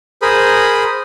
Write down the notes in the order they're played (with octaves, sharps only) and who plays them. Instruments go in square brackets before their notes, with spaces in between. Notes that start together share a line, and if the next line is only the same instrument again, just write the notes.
[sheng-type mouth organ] G#4 A#4 C5 B5 D#6